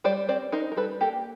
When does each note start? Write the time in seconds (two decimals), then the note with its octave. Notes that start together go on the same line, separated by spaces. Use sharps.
0.04 G3 C5 D5
0.29 C4 C5 D5
0.52 D#4 A#4 C5
0.72 A#4
0.76 G3 A4 B4
1.01 A#3 G4 A4